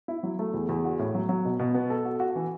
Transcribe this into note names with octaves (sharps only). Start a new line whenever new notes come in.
E4
F#3
A3
E2
E2
F#4
A2
F#3
F#3
B2
B2
B3
A4
F#4
F#4
E3